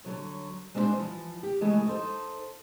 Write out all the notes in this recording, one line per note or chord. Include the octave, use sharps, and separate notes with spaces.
D3 F#3 C#5
G#3 C4 D4 E4 F#4 C5
E3 F3
G4
C#3 E3 G#3 A3
D#4 A4 C5